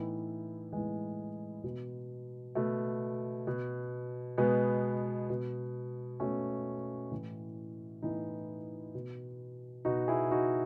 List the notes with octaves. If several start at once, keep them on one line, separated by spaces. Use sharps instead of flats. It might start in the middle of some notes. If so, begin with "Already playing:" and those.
Already playing: A2 E3 B3 D#4
A2 E3 G#3 B3
B2
B2 A3
B2
B2 G#3 B3
B2
B2 A3 C#4
A2 E3
A2 E3 B3 D#4
B2
B2 D#4 F#4
E4 G#4
D#4 F#4